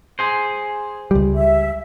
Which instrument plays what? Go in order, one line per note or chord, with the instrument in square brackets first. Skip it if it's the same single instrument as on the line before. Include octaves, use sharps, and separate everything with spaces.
[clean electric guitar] G#4 C5
[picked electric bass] C#2 G3
[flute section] E5